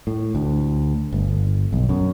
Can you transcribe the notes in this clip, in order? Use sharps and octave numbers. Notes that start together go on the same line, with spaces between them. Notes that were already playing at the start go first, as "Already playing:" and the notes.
A2
D2
G1
B1
F#2